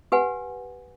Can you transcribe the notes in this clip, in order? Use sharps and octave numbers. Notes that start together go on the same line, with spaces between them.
G4 B4 F#5 G#5